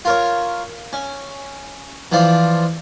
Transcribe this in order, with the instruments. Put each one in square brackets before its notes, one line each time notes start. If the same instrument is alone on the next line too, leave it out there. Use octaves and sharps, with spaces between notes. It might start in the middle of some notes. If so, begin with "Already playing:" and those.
[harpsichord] F4 A#4 C#5
C#4
E3 F3 D4 F4 D5